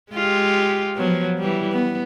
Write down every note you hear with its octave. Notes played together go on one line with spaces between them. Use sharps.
G#3 F4 G4
F3 F#3 B3
E3 G3
B3